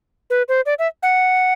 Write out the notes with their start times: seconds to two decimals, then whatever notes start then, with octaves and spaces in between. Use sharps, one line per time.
0.30 B4
0.48 C5
0.66 D5
0.79 E5
1.03 F#5